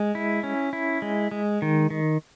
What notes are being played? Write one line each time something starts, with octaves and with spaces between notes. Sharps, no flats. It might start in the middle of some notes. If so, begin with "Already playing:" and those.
Already playing: G#3
E4
C#4
E4
G#3
G#3
D#3
D#3